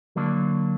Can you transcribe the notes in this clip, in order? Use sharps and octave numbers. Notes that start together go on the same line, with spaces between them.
D3 F#3 A#3 D4